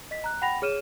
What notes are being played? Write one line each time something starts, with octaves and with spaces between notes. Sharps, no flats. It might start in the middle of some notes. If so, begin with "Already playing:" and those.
D#5 B6
A#5 F#6
F#5 G5 B5 A#6 F7
G#4 C#5 F6 D#7 E7